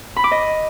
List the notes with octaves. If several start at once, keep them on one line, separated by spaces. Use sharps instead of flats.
B5
D6
D#5